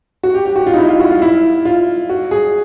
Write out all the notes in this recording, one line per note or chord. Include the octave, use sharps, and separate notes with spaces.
F#4
G4
G4
F#4
F4
D#4
E4
F4
F#4
F4
E4
F4
F#4
G#4